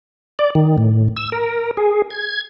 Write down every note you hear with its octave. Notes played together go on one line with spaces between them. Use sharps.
D5
D#3
A2
E6
A#4
G#4
G#6